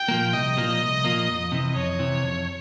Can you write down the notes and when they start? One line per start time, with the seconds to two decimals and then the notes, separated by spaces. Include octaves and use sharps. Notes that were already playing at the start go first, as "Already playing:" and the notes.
Already playing: G5
0.08 A#2 F3 A#3
0.33 C2 D#5
0.57 A#2 F3 A#3
0.81 C2
1.04 A#2 F3 A#3
1.28 F2
1.52 C3 E3
1.75 F2 C#5
1.99 C3 E3
2.23 F2